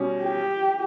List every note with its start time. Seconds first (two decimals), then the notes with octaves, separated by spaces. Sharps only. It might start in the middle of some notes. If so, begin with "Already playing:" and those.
Already playing: B2 G3 C#4
0.23 G4